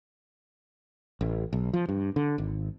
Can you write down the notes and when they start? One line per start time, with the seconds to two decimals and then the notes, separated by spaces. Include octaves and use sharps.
1.21 A1
1.53 B1
1.73 F3
1.89 G2
2.16 D3
2.38 G#1